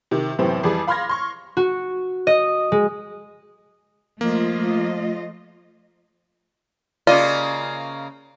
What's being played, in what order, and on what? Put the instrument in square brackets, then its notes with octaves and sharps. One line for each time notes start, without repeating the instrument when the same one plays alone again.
[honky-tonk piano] C3 D#3
F#2 A2 C3 E3 B3 C4
F2 E3 G3 G#4 D6
F5 B5 C6 F6 G#6 A#6
C6 C#6
[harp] F#4
D#5
G#3
[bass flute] F3 [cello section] A3 F4 D#5 [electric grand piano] A#3
[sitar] C#3 A#3 D#5 [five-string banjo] F4 [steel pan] D5